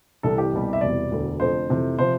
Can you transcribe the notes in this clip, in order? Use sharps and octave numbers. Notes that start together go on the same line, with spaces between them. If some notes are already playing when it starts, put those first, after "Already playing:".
C2 C3 E3 G3 A4
G4
C2 B2 G3
E5
E1 E2 C3 G3 D5
E1 D2 D3
F1 F2 D3 C5
F2 C3 E3 A3
C3 F3 C5